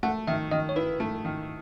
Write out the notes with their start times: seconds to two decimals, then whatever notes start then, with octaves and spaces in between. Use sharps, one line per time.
0.03 A3 F#5
0.27 D#3 E5
0.52 D#3 D#5
0.69 C#5
0.76 E4 B4
1.00 A3
1.25 D#3